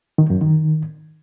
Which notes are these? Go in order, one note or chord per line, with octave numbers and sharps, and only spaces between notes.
D#3
F#2
D#3